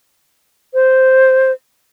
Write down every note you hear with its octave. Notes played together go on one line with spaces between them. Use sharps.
C5